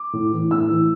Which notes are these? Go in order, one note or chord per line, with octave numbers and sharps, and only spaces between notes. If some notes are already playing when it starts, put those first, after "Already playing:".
Already playing: D6
A2
E3
A2 E6
E3